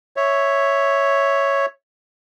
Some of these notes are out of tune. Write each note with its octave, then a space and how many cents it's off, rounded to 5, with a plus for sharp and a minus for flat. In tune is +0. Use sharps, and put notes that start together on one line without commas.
C#5 +0 E5 +0